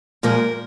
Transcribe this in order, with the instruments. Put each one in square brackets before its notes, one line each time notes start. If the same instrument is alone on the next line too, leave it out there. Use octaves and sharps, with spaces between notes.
[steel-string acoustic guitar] A#2 F3 G#3 A#4